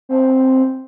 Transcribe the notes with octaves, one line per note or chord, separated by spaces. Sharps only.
C4